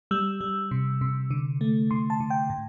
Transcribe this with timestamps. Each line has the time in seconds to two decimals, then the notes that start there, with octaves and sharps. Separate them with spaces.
0.11 G3 E6
0.41 G3
0.71 C3
1.01 C3
1.31 D3
1.61 A3
1.91 D3 C6
2.10 A5
2.20 D3
2.30 G5
2.50 A2